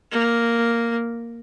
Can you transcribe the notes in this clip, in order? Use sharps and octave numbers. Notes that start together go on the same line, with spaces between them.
A#3